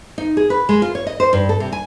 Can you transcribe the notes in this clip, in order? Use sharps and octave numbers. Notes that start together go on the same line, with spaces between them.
D#4
G#4
B4
G#3
F4
C#5
D#5
C5
G2
A4
C3
G#5